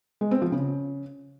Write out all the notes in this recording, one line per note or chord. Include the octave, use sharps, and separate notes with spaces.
G#3
C4
F3
C#3